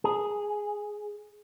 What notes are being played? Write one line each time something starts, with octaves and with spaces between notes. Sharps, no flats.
G#4